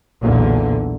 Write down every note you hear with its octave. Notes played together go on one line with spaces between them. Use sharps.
B1 E2 A#2 D3